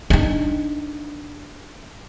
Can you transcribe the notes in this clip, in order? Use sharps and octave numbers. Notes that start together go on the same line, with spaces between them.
D4 D#4